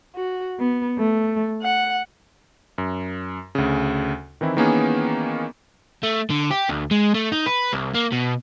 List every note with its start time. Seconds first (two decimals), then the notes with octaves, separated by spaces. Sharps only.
0.16 F#4
0.60 B3
0.98 A3
1.62 F#5
2.78 F#2
3.55 D2 C#3
4.41 D#3 E3 C4 E4
4.57 D#3 E3 A#3 B3 C#4 G#4
6.03 A3
6.30 D3
6.51 G4
6.69 D2
6.91 G#3
7.15 A3
7.32 D#4
7.47 B4
7.73 C2
7.95 A#3
8.12 B2